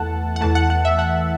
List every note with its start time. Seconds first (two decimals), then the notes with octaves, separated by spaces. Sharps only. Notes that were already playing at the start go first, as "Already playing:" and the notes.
Already playing: E2 E3 A3 F#5 A5
0.36 F#5
0.41 E2 E3 A3 A5
0.55 F#5
0.70 F#5
0.85 E5
0.99 F#5